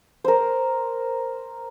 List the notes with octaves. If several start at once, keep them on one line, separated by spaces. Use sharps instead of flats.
A#4 C5